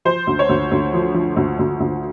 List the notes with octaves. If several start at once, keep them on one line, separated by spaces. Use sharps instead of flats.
F3 C5
D2
C#5
D2
D2
F3
F3
D2
D2
D2